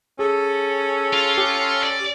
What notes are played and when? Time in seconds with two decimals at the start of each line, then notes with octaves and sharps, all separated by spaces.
0.19 C#4 G#4 A4
1.13 F4
1.38 G4
1.83 D5